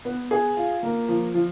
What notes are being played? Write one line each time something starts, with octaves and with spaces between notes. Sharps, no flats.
B3
G#4
F4
A#3
F3
F3